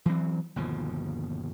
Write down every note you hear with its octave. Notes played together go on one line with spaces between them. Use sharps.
E3 F#3 C4
G1 D#2 B2 F3